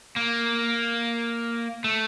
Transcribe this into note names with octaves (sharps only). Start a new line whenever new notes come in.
A#3
A3